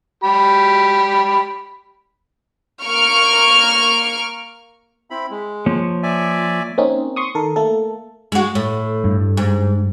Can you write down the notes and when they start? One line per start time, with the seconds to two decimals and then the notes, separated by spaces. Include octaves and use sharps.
0.24 G4 B5
2.84 A#3 C#6 F6 D7
5.10 C4 E4 B5
5.30 G#3
5.66 F3 A#3 C#5
6.03 D5 E5 G#5
6.78 A#3 C4 C#4 D#4
7.16 C6 C#6 D#6
7.35 D#3 A4 A#4
7.56 A3 A#3 A4
8.32 G#3 F#4
8.55 A2
9.04 G2
9.37 G#2